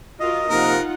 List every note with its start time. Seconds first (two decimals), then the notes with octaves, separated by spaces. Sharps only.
0.20 F4 F#4 A#4 D#5
0.50 C3 F3 A#3 D#4 F4 A#4 F#5